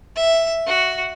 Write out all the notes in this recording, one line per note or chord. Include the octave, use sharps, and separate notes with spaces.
E5
F#4